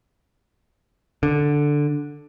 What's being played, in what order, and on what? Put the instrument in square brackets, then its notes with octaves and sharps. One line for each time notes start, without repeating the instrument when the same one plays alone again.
[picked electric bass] D3